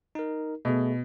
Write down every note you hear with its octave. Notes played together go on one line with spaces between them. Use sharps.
D#4 A#4
B2 A3 G#4